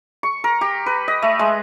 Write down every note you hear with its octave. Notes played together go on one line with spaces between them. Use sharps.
C#6
A#4
G4
B4
D#5
A3
G#3